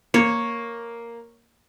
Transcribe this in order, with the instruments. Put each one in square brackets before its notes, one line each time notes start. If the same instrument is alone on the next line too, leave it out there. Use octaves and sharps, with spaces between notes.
[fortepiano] A#3 [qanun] C#5